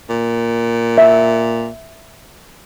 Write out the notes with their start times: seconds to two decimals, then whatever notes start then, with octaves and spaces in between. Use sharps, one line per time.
0.10 A#2
0.98 E5